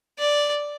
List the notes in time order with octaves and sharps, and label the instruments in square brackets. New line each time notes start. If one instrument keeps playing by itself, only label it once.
[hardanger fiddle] D5